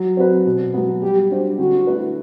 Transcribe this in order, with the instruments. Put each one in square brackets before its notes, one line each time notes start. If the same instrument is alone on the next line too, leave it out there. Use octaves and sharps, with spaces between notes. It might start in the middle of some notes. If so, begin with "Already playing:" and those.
Already playing: [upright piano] F#3
C4 F#4 B4
B2
F#3 B3
[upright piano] G3 [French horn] G4
[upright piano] D4 F#4 C5
[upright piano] D3 [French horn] F#4
[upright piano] A3 E4 B4